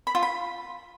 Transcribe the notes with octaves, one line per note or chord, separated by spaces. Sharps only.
B5
F4
B5